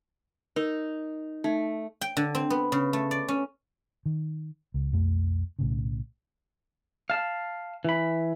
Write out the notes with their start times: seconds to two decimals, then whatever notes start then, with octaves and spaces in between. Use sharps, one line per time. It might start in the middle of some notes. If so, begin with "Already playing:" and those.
0.56 D#4 A#4
1.44 A3 D#4
2.01 G5
2.17 D3
2.35 C4
2.50 B3
2.72 C#3
2.93 A3
3.11 D5
3.28 C#4
4.06 D#3
4.74 C#2
4.92 B1 F2 A3
5.59 B1 A2 C#3
7.10 F5 A5
7.85 E3 B5